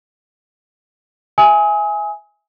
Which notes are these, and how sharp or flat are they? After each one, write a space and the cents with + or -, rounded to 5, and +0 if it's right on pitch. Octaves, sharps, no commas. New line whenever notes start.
E5 +0 G#5 +0 D#6 +40